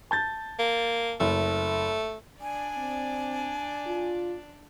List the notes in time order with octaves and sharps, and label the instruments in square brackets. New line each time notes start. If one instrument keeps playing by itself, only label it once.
[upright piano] A5 G6 A6
[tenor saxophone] A#3
[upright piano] F#1 [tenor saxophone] A3
[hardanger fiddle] D4 D5 [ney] G#5
[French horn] C4
F4